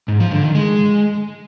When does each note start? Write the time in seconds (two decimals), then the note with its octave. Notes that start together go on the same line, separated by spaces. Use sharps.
0.08 G#2
0.20 F3
0.32 D3
0.43 D#3
0.55 G#3